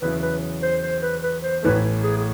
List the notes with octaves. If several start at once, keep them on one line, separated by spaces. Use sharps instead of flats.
E2 C#3 F#3 B3 E4 B4
B4
C5
C5
B4
B4
C5
A1 A2 E3 A3 B4
G#4
G#4